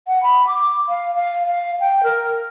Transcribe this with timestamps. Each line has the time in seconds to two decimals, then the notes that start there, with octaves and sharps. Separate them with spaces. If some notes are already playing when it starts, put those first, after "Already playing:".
0.07 F#5
0.23 B5
0.47 D6
0.88 F5
1.15 F5
1.46 F5
1.80 G5
2.03 A#4